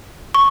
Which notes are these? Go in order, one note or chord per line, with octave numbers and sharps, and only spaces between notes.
C#6